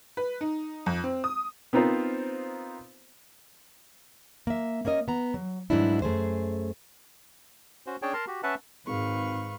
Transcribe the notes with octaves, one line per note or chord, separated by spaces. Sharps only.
B4
D#4
F2
C4
D#6
B3 C4 D#4 F4 A#4 C5
A#3 E5
A#3 C#4 A#4 D#5
B3 A#5
F#3
G#2 E3 F#3 G3 D4 E4
F#2 A3 G#4 C5
C#4 F#4 C5
C#4 D4 G#4 C#5 G5 A5
A#4 A5 A#5 C6
F#4 G4
C#4 B4 E5 F#5 A5
G#1 G#2 B4 F5 C#6